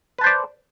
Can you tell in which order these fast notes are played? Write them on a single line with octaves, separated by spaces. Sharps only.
B4 A5 C5 D5